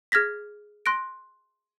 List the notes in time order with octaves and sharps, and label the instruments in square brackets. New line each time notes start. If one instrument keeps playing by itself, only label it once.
[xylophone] G#4 F6 G#6 A#6 B6
C6 F#6 A#6 D7